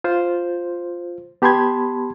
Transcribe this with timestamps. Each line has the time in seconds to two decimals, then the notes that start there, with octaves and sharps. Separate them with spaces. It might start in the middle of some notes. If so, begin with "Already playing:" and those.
0.04 F4 C5
1.42 B3 G4 A5 B5 C6 G#6